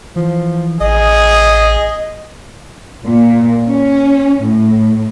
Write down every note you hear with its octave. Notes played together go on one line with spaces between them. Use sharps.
E3 F3
A1 G#4 D#5
A#2
C#4
A2